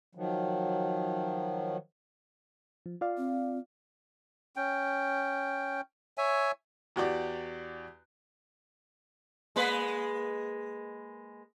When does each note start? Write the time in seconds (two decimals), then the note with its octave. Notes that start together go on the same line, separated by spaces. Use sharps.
0.15 D#3 F3 F#3
2.86 F3
3.01 F4 D5 F5
3.17 C4
4.56 C#4 G5
6.18 C#5 E5 G#5
6.96 E2 F#4 G4 D5
9.56 G#3 A#3 B4